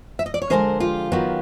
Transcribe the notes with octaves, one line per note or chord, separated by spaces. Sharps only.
E5
D#5
D5
C#5
D3 F3 G#3 C#4 A#4 C5
F4 G4
D#3 F#3 B3